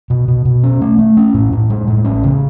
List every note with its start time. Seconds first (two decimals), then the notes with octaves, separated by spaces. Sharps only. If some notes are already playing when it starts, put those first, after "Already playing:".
0.10 B2
0.28 B2
0.45 B2
0.63 C#4
0.81 A3
0.99 A3
1.17 C#4
1.34 A2
1.53 A2
1.70 G#3
1.88 A2
2.05 C#4
2.23 C#3